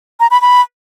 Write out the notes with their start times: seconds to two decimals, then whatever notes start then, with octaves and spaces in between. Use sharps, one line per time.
0.20 A#5
0.31 B5
0.41 B5